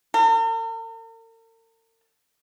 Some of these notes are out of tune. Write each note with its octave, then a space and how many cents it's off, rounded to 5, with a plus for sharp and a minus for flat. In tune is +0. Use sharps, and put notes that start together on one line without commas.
A#4 -45